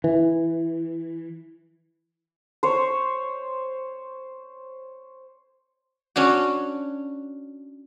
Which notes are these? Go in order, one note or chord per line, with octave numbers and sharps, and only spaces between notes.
E3
C5 C#5
C#4 D4 F#4